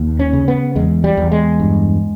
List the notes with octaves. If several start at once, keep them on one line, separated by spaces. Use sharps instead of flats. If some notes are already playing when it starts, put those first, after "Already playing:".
Already playing: D#2
C#4
C#3
B3
E2 G#3
G3
E2
G#3
G2